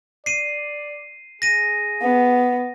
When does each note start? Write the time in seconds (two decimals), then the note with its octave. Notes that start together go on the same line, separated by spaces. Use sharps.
0.26 D5 C7 D#7
1.42 G#4 A#6 D#7
2.02 B3